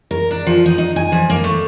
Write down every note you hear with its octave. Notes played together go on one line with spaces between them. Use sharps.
A#4
D4
F3
D#4
D#4
G#5
F3
A#3
A3